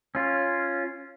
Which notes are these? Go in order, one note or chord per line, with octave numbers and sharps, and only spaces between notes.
C#4 F4